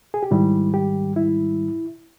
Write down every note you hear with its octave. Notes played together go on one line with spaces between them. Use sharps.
G#4
G4
G#2 D#3 G3 E4
G4
E4